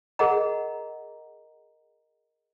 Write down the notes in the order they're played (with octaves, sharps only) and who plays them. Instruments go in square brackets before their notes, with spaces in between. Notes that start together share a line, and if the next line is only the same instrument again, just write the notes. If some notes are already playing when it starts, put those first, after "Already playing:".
[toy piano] G#4 A#4 D#5 F#5 A#5